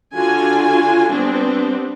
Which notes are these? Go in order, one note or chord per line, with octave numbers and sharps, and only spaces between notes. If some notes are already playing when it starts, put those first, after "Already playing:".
D3 F4 F#4 G#5
G3 B3 C4 D4